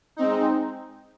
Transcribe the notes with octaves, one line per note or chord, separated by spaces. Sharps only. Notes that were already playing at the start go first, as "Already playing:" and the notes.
G#3 C4 D#4